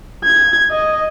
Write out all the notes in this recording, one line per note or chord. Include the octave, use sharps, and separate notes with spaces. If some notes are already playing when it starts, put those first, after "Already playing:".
G#6
D#5